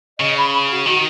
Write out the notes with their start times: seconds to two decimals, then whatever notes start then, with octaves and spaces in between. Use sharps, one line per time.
0.20 C#3 D#5
0.37 B5
0.53 B5
0.69 F#4
0.86 D#3 F#4